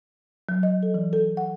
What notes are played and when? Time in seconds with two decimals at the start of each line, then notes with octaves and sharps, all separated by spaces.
0.49 F#3
0.63 D#5
0.83 A4
0.94 E3
1.13 A4
1.37 F#5